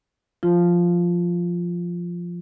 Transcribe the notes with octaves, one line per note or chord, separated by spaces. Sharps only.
F3 F4